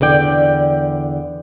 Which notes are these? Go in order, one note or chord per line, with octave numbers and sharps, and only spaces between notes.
E2 D3 D5 G5